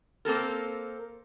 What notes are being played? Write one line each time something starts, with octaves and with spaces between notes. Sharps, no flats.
A#3 C4 A4 A#4